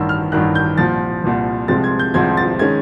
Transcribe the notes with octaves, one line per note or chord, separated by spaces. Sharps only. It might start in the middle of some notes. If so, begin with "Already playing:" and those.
Already playing: A1 G2 D#3 E6
F6
A1 G2 D#3 F#6
G6
C2 A#2 F3 A6
C2 A#2 F3
C2 C3 F3 G#3 C4 A6
G#6
G6
C2 C3 F3 G#3 C4 G#6
A6
D#3 G#3 C#4 G#6